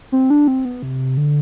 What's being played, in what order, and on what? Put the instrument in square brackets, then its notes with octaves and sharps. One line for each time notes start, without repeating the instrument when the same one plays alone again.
[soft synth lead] C4
D4
C4
B3
C3
D3